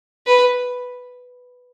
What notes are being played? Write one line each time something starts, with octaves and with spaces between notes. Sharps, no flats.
B4